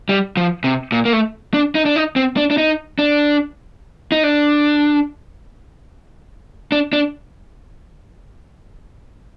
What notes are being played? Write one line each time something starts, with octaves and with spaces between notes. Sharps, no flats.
G3
F3
C3
A#2
A#3
A3
D4
D#4
D4
D#4
C4
D4
D4
D#4
D4
D#4
D4
D4
D4